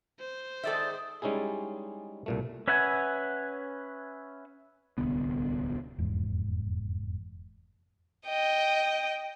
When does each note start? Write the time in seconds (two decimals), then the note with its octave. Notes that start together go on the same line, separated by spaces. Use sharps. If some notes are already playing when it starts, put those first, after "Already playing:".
0.20 C5
0.63 G#2 D#3 A4 D5 E5
1.22 G3 G#3 C#4 D#4 E4 G#4
2.26 C2 A#2 A3
2.68 C#4 B4 E5 F#5 G#5
4.98 D1 C2 D3 B3
5.98 F1 E2 G#2
8.28 D#5 G5